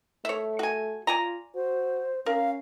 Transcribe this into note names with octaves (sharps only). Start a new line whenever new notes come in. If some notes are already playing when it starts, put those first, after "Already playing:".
A3 C#5 E5
F#4 G#5
F4 D5 G#5 A#5
F#4 C5
C#4 A#4 F5